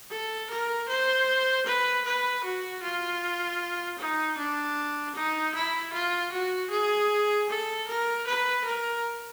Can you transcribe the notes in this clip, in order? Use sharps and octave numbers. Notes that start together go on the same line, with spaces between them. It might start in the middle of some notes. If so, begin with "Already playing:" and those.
A4
A#4
C5
B4
B4
F#4
F4
D#4
D4
D#4
E4
F4
F#4
G#4
A4
A#4
B4
A#4